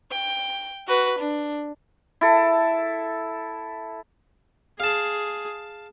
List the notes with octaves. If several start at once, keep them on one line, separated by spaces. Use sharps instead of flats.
G5
F#4 B4
D4
E4 A4
G#4 F5 A5